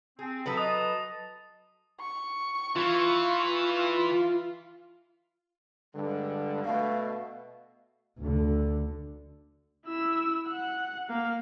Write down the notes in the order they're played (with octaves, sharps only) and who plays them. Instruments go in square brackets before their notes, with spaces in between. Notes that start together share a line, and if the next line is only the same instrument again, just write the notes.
[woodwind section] C4 [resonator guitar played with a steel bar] G#4
[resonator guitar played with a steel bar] F#3 A4 B4 [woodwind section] E5 D#6
[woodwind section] D#5 A5 [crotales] D#6
[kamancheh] C#6
[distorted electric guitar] E3 [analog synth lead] F4
[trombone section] G2 D3 [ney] G#3
[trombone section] B2 A3 [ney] F5
[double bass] D2 D3
[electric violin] E4 E6
F#5
A#3 F5